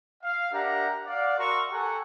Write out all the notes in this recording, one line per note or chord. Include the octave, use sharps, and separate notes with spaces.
F5
D4 G4 A#4 E5 F#5 A#5
D5 F5 F#5
F#4 A#4 E5 A#5 C6 C#6
G4 A4 F#5 G#5 A#5 C#6